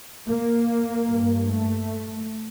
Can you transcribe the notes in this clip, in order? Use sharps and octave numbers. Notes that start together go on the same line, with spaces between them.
A#3
G2
A3